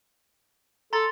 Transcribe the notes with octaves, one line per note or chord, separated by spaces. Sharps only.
A4 A#5 C6 A6